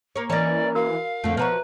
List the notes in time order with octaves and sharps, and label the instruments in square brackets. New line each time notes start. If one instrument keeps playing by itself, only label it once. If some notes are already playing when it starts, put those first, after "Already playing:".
[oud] A#3 C#5
[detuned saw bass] E3 [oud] A#3 C#4 [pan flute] D5 [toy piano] D#5 A#5
[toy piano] F#4 A#4 [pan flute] F5
[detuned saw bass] F2 [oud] D3 A3
[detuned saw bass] B2 [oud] F3 F#4 C#5 [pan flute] B4 [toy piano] E5 A#5